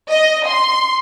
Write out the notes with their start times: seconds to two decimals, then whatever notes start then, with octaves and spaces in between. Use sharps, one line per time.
0.10 D#5
0.47 C6